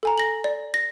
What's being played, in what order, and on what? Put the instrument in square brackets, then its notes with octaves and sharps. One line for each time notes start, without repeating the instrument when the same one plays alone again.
[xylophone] A4 G#5 A#5
A#6 F#7
D5
A#6